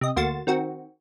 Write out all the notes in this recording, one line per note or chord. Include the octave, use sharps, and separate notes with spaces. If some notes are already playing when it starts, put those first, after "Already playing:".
C3 D#5
D2 A#3 F#4 C6 A6 E7
D#3 C4 F#4